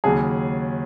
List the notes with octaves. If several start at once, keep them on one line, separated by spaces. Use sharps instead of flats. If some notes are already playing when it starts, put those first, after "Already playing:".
D#2 C#3 F#3 G#4